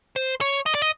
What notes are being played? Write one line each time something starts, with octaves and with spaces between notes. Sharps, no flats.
C5
C#5
D#5
D5
D#5